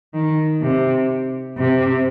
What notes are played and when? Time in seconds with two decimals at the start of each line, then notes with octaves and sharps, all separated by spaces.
0.14 D#3
0.62 C3
1.57 C3